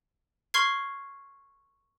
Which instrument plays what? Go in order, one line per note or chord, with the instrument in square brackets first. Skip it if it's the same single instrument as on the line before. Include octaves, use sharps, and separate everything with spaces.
[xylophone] C6 C#6 F6 G#6 C7